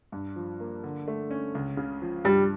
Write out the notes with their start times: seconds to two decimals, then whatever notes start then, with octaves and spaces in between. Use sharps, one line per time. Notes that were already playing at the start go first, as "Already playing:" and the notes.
0.12 G2
0.36 F3
0.60 A#3
0.84 D3
1.08 A3
1.31 C#4
1.55 C#2
1.77 C#3
2.02 F3
2.24 G2 G3